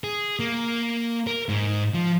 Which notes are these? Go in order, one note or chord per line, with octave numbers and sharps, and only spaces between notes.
G#4
A#3
A#4
G#2
F3